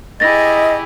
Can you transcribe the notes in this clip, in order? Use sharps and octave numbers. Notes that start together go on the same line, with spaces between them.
E4 G4 G#4 D#5 A6 A#6